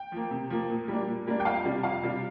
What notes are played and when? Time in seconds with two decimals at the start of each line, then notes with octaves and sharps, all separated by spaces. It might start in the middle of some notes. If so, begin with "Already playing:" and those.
Already playing: G5
0.12 F3 A#3
0.31 C3
0.50 F3 A#3
0.70 A#2
0.88 G3 A#3 D4
1.08 A#2
1.27 G3 A#3 D4
1.40 G5
1.45 F2 F5
1.65 C3 G3 D4
1.83 F2 F5
2.03 C3 G3 D4